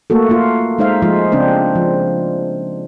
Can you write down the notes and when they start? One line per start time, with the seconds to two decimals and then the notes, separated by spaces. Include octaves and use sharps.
0.10 A3 A#3 F#4 A4
0.29 A#3 F4
0.79 G#3 D#4 C5 E5 F5
1.02 F3 G#3 F4
1.32 C#3 C4 D4 C5
1.75 F3